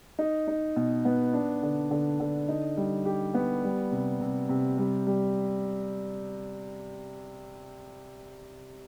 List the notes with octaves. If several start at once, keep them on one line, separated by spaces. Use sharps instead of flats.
D#4
D#4
B2
B3
D4
D3
D3
D3
D#4
G3
G4
B3
G3
C3
C3
C3
G3
G3